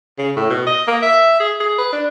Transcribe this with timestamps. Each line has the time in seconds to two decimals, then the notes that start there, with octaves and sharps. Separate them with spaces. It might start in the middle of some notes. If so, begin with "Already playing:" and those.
0.18 C#3
0.36 A2
0.50 B2
0.67 D#5
0.87 A#3
1.02 E5
1.40 G#4
1.60 G#4
1.78 B4
1.93 D4